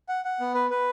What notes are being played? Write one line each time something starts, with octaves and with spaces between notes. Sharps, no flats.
F#5
F#5
B3
B4
B4